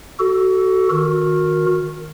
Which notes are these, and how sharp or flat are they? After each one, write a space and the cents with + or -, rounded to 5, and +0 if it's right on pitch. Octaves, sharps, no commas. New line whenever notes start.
F#4 +25 A4 +0
D#3 -5 F#4 -30 A#4 +0